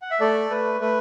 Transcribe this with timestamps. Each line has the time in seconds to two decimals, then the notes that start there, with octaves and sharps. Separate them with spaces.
0.02 F#5
0.11 E5
0.20 A3 A4 D5
0.50 A3 B4
0.81 A3 B4